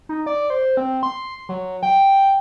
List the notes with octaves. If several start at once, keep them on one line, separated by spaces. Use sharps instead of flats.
D#4
D5
C5
C4
C6
F#3
G5